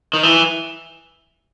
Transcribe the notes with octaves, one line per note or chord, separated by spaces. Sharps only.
D#3
E3